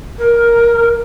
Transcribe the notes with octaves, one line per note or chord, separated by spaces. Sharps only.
A#4